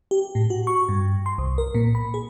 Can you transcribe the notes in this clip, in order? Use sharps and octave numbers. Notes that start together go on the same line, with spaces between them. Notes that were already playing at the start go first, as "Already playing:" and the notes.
G4
A2
F#4
C#6
G2
C6
C2
A#4
A#2
B5
G#4